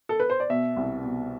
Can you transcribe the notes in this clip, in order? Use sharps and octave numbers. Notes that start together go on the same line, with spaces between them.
A4
B4
C5
D5
B2 E5
C2
B2